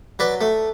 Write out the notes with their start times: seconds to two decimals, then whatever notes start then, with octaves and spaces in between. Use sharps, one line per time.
0.19 F#3 B4 D5
0.41 A3